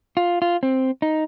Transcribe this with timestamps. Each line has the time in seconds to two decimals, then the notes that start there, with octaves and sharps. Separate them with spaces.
0.17 F4
0.42 F4
0.63 C4
1.02 D#4